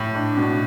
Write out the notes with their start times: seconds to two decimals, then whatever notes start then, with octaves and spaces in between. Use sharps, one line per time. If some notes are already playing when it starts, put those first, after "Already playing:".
Already playing: A2
0.15 D4
0.38 B2